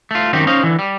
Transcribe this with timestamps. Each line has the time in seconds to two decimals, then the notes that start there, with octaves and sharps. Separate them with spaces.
0.11 A3 F4
0.33 F#2 D#3 C4 D#4 G4
0.47 C#4 D#4 C5 D#5 F5
0.63 D3 E3
0.79 G3